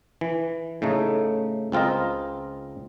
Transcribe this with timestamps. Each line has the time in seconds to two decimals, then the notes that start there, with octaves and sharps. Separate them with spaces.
0.21 E3
0.82 A2 C#3 A3 D#4
1.72 C#2 C4 F4 A#4 D#5